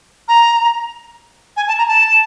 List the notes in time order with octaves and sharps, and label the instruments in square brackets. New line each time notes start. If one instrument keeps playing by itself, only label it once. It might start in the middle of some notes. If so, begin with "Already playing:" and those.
[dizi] A#5
G#5
A5
A#5
A5